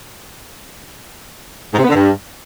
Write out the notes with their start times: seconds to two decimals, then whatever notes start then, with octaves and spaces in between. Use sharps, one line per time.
1.73 G#2
1.78 C3
1.84 B3
1.89 D3
1.94 G2